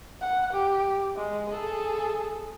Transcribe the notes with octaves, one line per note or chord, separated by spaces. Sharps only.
F#5
G4
G#3
G#4 A4